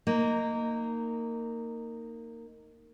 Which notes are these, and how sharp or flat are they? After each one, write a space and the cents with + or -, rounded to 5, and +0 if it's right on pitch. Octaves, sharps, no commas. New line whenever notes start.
A#3 -15 D#4 +0